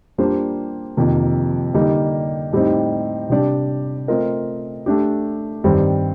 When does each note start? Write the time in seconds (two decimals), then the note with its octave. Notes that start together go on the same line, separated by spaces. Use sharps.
0.18 G3 A#3 D4 F4 C5
0.97 F2 C3 D#3 A#3
1.74 D3 G3 A#3 D#4
2.52 A2 G3 C4 D#4
3.30 C3 G3 D4 G4 D5
4.08 A3 C4 F4 A#4 D#5
4.86 A3 D4 G4
5.64 G2 D#3 G3 C4